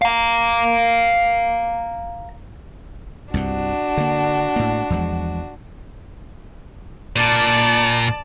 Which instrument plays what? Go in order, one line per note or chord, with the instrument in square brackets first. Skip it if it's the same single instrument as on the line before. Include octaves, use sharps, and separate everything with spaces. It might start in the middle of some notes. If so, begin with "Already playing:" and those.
[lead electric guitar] F5 A#5
[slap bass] C2 G2 C3 [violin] D4 F#4
[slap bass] D3 A#3
A2 A#3
E2 F3 G#3
[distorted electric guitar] A#2 [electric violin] D5 A5